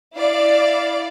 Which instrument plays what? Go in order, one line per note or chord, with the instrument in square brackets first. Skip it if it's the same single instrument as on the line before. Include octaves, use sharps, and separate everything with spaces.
[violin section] E4 D5 F5